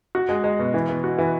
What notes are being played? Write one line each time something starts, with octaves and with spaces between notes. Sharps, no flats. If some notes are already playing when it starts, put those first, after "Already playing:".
F#4
G#3
G#3
B2
E3
B3
F#4
E3